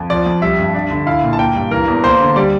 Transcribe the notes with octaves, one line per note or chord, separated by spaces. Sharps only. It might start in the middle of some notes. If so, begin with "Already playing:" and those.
Already playing: F2
F3 D5
F2
G3 E5
G2
D4
D3
E4 F5
A#2
A5
A#3 G5
G2
E3 A#4
E2
A#3 C5
D3
G3 D5